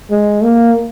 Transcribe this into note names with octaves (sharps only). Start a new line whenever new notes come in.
G#3
A#3